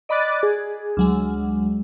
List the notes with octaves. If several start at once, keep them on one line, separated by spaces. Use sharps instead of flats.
D5 D#5 B5 D6 F#6 A6
G#4
D2 F#3 G#3